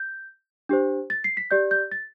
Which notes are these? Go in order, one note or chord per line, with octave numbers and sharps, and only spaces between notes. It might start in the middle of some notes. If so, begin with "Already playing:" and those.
Already playing: G6
D4 G4 C5
A6
C7
B6
G4 D5 G6
G6
A6